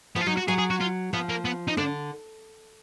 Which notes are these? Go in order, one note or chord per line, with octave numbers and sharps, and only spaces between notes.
F3 B3
F4
F#3 D#4
F#4
F#3 G#4
G#4
F#4
F4
F3 B3
A#3
B3
D#4
D3 D4